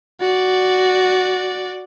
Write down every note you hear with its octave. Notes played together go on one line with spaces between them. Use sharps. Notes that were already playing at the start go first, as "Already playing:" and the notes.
F#4 D5